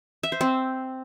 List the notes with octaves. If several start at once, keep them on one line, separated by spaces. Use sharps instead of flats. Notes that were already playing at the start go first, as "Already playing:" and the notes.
E5
C5
C4